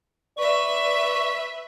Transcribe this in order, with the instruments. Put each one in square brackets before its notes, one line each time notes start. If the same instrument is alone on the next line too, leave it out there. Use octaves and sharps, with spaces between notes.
[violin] B4 E5 [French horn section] D5 [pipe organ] C#6